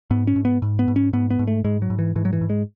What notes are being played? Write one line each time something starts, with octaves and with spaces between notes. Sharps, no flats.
G#2 B3
C#4
G#2
B3
G#2
B3
G#2
C#4
G#2 B3
B3
G#2
A3
G#2 G#3
F#3
G#2
E3
G#2 E3
F#3
E3
G#2
G#3